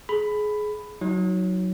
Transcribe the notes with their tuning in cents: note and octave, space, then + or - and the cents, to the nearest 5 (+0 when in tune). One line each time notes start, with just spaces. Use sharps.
G#4 +25 B5 +10
F#3 +0 D#4 +35